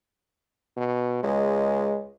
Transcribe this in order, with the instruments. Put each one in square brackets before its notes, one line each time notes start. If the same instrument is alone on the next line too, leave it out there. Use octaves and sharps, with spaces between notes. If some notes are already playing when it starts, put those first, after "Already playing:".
[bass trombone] B2
[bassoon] C#2 [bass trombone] G#3